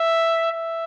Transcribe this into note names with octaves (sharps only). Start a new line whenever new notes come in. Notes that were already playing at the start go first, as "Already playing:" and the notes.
Already playing: E5
E5